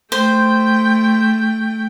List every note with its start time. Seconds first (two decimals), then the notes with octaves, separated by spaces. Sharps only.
0.12 A3 C5 G5